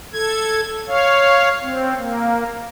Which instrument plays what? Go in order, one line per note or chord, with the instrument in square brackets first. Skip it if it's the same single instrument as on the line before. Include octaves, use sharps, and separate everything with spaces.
[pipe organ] A4 G#6
C#5 F5
C4
A#3